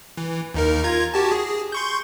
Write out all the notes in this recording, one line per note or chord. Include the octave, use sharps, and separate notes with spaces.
E3
D#2 D#4 A#4
F4 A#5 G#6
F#4 G4 A5
G#4
C6 C#6 G6